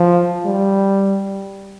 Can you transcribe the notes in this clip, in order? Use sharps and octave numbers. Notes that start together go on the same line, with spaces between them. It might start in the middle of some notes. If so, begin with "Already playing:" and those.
Already playing: F3
G3